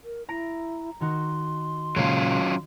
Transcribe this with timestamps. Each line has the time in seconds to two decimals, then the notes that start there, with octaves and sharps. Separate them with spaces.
0.04 A#4
0.29 E4 A#5 A#6 D7
1.01 D#3 D#4 F#4 C6
1.96 A#2 C#3 F#3 G#3 C#4 F4